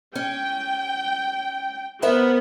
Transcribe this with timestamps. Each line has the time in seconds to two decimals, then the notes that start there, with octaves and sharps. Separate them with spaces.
0.15 C#4 G5
2.02 B3 A#4 C5 E5